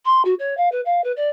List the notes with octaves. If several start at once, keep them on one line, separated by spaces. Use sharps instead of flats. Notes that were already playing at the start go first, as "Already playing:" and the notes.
C6
F#4
C#5
F5
B4
F5
B4
D5